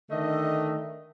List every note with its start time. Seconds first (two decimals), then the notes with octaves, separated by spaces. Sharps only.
0.10 D3 D#3 A3 D#5